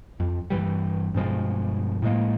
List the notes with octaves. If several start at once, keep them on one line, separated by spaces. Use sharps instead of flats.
F2
G2 E3 G3
G2 B2 F3 G#3
A2 F3 G#3 A#3